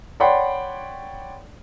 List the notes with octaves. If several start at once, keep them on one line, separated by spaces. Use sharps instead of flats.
C#5 D5 F#5 G5 B5 C6